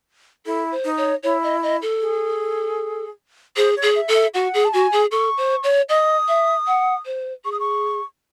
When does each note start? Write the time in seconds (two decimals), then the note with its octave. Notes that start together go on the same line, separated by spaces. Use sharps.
0.45 E4 A4
0.71 C5
0.84 D#4
0.97 C#5
1.23 E4 C#5
1.43 D#5
1.63 D#5
1.82 A4
2.01 G#4
3.56 G#4 C5
3.76 C#5
3.82 G#4
3.95 E5
4.08 A4
4.14 E5
4.34 F#4 F#5
4.54 G#4
4.65 A5
4.73 F#4 G#5
4.92 G#4
5.11 A4 C#6
5.37 C5
5.63 C#5
5.89 D#5 D#6
6.28 E5
6.67 F#5
7.05 C5
7.44 G#4 C#6
7.52 D#6
7.60 C#6